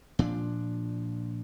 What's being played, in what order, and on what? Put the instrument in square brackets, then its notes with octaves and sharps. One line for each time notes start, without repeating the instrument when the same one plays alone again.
[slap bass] A#2 F3 D4